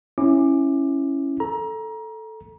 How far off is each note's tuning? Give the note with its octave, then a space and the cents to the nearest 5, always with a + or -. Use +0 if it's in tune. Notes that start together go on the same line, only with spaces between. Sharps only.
C#4 -10 E4 +0 D6 +15
A4 +0 A#5 +25